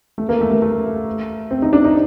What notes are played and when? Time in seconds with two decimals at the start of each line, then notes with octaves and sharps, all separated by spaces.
0.18 A3
0.29 A#3
0.41 A3
0.51 A3
0.62 A3
1.51 C4
1.62 D#4
1.73 D4
1.85 D#4